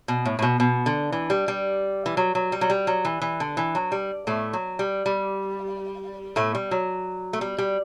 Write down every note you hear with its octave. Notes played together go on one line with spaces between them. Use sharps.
B2
A2
A2
B2
B2
D3
E3
G3
G3
E3
F#3
F#3
G3
F#3
G3
F#3
E3
E3
D3
E3
F#3
G3
A2 A3
F#3
G3
G3
A2 A3
G3
F#3
A3
G3
G3